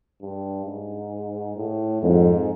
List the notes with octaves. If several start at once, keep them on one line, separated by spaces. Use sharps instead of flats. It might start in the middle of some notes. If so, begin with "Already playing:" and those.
G2
G#2
A2
F2 G#2